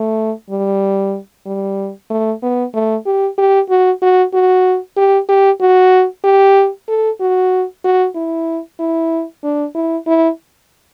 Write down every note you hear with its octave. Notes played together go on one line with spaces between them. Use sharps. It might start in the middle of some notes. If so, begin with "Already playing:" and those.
Already playing: A3
G3
G3
A3
B3
A3
G4
G4
F#4
F#4
F#4
G4
G4
F#4
G4
A4
F#4
F#4
E4
E4
D4
E4
E4